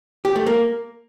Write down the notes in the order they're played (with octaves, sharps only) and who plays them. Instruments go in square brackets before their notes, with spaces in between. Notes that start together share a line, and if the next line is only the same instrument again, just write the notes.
[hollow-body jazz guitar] G4
A3
A#3